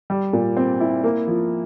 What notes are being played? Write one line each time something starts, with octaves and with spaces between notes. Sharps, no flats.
G3
A#2
C4
E4
A#3
F3